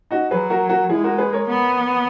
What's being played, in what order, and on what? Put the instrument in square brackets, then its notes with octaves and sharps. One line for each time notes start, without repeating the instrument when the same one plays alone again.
[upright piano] D#4 F#4
[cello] F#3 [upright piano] G#4 B4
[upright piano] F#4 A#4
F#4 A#4
[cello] G#3 [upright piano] E4 G#4
[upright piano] F#4 A#4
G#4 B4
A#4 C#5
[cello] B3